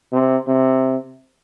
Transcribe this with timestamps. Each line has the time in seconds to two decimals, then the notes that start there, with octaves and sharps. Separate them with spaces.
0.12 C3
0.48 C3